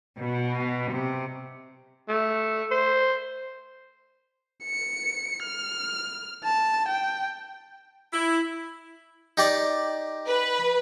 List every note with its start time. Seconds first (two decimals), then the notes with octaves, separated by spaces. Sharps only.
0.18 B2
0.91 C3
2.09 A3
2.71 C5
4.64 C#7
5.44 F6
6.44 A5
6.88 G5
8.12 E4
9.37 D#4 G4 D5
10.27 B4